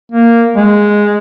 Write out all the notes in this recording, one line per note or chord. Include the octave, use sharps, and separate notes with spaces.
A#3
G#3